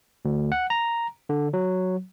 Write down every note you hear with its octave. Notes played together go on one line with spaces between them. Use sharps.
D2
F#5
A#5
D3
F#3